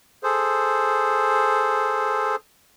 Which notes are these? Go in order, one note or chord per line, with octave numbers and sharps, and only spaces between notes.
G#4 A4 C5